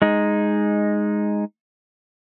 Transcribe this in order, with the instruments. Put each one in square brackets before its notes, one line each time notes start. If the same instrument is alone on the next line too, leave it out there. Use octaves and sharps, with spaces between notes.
[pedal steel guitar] G#3 D#4